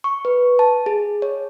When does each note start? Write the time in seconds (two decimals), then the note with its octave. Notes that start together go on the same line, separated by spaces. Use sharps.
0.04 C#6
0.25 B4
0.59 A5
0.86 G#4
1.22 C#5